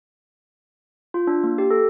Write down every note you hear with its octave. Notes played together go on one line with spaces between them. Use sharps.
F4
D4
A#3
G4
A4